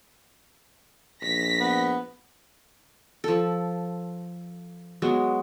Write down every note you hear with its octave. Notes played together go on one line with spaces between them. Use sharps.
A#1 A#6 B6
B3
F3 A4
F#3 G#3 B3